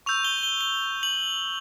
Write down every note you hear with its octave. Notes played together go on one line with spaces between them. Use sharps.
C#6 E6 G6 F7
G7
G7
G7
F#7